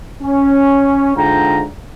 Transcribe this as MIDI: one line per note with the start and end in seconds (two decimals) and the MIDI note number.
0.23 1.12 61
1.17 1.64 44
1.17 1.64 50
1.17 1.64 65
1.17 1.64 79
1.17 1.64 82